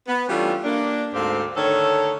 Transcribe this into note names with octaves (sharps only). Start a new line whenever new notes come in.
B3
E3 G3 A3 C#4 D4 F4
A#3 D4
D2 G#2 C4 G4 A4 F5
D3 D#3 A3 A4 C#5